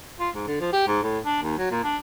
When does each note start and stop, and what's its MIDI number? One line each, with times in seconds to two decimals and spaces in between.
0.20 0.29 65
0.34 0.47 44
0.47 0.56 50
0.60 0.72 53
0.73 0.87 67
0.87 1.01 44
1.03 1.18 45
1.23 1.40 62
1.42 1.57 39
1.58 1.69 54
1.71 1.81 46
1.84 1.96 62